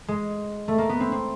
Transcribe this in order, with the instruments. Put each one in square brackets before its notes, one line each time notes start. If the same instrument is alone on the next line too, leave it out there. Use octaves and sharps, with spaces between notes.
[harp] G#3
A3
A#3
B3
C4
C4